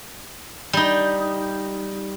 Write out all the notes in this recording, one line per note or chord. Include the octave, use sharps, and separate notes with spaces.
G3 D#4